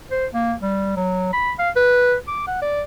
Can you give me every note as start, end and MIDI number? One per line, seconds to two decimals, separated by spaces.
0.11 0.26 72
0.34 0.54 58
0.61 0.92 55
0.96 1.32 54
1.33 1.52 83
1.59 1.70 77
1.76 2.15 71
2.27 2.46 86
2.47 2.60 78
2.62 2.83 74